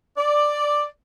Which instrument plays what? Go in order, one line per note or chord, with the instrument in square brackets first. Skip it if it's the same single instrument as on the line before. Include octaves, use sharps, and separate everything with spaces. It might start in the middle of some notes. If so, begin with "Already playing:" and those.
[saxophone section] D5